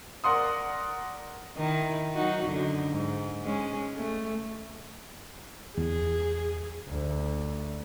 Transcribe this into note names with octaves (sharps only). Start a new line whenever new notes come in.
A#4 D5 F#5 C6 D#6
D#3 D#4 E4
F#3 D#4 F#4
F#2 D3 D#4
G#2
G#3 C#4
A3
E2 G#4
D2